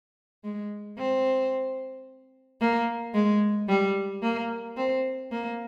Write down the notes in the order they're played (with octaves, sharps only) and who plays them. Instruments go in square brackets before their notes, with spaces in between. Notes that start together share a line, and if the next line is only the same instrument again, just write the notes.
[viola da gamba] G#3
C4
A#3
G#3
G3
A#3
C4
A#3